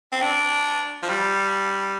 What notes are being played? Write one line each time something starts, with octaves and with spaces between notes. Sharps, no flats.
C4
D4
F3
G3